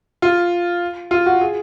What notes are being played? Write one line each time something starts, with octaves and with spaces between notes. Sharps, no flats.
F4
F4
F#4
G#4